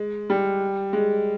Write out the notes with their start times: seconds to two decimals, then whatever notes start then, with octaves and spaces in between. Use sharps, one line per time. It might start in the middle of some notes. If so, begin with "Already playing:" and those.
Already playing: G#3
0.30 G3
0.93 G#3